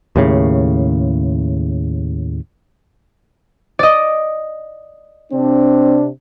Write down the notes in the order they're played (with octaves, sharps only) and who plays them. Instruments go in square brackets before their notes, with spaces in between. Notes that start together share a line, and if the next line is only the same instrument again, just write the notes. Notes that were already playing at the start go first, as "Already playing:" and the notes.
[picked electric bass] D#2 A2 C#3
[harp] D5 D#5
[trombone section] C3 C4 D4